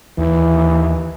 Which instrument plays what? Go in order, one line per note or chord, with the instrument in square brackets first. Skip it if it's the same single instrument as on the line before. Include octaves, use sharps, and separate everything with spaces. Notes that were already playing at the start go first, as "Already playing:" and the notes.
[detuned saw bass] D#2 [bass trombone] E3